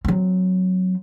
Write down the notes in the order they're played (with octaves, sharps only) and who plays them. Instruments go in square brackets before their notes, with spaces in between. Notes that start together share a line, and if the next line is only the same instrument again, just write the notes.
[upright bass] F#3 C4